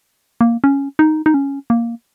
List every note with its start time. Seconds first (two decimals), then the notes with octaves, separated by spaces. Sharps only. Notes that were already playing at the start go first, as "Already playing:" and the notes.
0.41 A#3
0.64 C#4
0.99 D#4
1.26 D#4
1.34 C#4
1.70 A#3